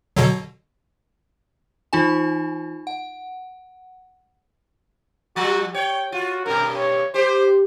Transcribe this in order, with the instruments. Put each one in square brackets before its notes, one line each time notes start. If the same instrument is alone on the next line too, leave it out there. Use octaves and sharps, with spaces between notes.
[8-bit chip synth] B2 D3 F#3
[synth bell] E3 D#4 F4 G#5
F#5
[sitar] F3 G3 [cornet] F#4
[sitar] C#5 [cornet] G5
[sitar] F4 [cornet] F#4
[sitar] G2 B2 [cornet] A#4
[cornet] C#5
[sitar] G4 [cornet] C5